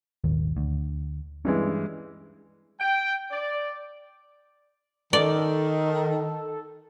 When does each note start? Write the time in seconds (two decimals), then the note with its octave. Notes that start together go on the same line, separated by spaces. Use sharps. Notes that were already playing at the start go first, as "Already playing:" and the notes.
0.24 D#1 G#1 D#2
0.57 D2
1.45 G2 E3 G#3 C4 C#4
2.80 G5
3.31 D5
5.13 D#3 A4 D5